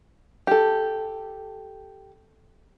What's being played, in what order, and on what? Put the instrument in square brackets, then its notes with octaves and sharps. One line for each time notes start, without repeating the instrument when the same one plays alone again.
[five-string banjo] G4 A4